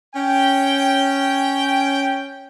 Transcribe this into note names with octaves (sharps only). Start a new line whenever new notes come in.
C#4 G5